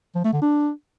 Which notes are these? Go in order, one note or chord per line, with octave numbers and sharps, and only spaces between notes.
F3
A3
D3
D4